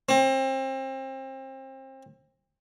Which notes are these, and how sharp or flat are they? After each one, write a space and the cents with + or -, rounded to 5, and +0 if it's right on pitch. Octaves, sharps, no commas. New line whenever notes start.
C4 +30